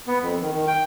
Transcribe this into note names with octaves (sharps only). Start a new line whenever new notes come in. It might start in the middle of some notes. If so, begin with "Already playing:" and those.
B3
F2
D#3
D#3
G5